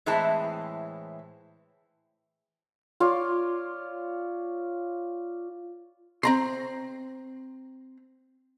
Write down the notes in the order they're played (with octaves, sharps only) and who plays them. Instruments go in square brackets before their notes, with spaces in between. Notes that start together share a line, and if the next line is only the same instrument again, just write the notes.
[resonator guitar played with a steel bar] A2 E3 G#3 C4 E4 A5
[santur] F4 C#5 D5
[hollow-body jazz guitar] C4 A#5 C6